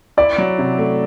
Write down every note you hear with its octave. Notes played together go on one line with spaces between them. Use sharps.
E4 D5
F#3
C3
A3